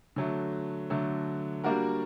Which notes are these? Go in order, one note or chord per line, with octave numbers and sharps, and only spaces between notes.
D3 F#3 A3
D3 F#3 A3
G3 A#3 D4 F#4 A#4